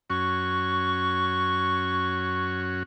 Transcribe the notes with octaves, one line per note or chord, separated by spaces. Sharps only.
F#2 C#4 F#4 C#6